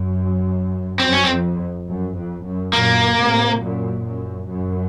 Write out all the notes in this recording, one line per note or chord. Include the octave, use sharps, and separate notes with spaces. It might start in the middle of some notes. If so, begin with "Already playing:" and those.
Already playing: F#2
F#2 C4
C#4
C4
F2
F#2
F2
F#2
F#2 A#2 A#3
A2 C3
F#2 A#2
F#2
F#2